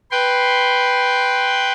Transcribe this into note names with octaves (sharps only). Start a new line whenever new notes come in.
B4 G5 C6